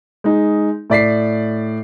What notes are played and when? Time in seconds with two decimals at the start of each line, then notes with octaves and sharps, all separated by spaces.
0.24 G#3 D#4
0.90 A2 D5 B6 C7